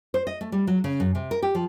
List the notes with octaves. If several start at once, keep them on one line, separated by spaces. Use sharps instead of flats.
C5
D#5
A3
G3
F#3
C#3
F#2
C3
A#4
G4
F3